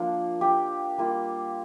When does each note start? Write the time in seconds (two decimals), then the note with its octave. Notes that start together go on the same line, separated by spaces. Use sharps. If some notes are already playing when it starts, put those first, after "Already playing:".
Already playing: F3 A#3 D4 F4
0.41 G4
0.98 G3 A#3 F4